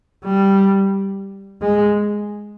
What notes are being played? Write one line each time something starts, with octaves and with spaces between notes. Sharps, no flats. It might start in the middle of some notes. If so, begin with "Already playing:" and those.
G3
G#3